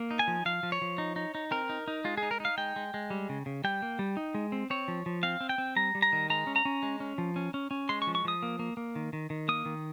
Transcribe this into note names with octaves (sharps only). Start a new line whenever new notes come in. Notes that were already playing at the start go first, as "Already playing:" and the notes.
Already playing: A#3
D#4
G#5
F3
F3 F5
F3
C#5
F3
D#4
D#4
D#4
C4 A#4
D#4
D#4
G#3 F4
G#4
D#4
A#4
D#4 F5
G#3 G5
G#3
G#3
G3
C#3
C#3
G3 G5
A#3
G3
D#4
G#3
C4
C4 C#5
F3
F3
C4 F5
C4
G5
C4
G3 A#5
G3
A#5
D#3
G#3 A#5
C#4
A#5
C#4
G#3
C#4
F3
C#4
C#4
C#4
G#3 C6
C#6
F3
C#6
F3 D#6
A#3
A#3
A#3
D#3
D#3
D#3
A#3 D#6
D#3